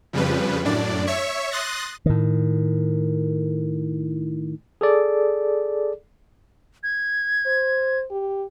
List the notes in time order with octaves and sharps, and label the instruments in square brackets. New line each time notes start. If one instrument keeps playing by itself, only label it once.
[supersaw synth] F2 C#3 F3 G3 B4
F#2 A2 D4 D5
C#5 E5 C#6
C6 D#6 F#6 A6 A#6
[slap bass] A2 D#3
[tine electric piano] G#4 A4 D5
[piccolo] G#6
[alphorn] C5
G4